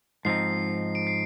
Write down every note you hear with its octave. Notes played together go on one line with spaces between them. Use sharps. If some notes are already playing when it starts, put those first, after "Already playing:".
G#2 F3 C4 D#4 C7
D7
C7